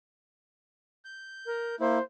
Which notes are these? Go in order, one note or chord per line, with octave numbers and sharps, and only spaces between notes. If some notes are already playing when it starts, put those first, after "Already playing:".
G6
A#4
A#3 E4 C5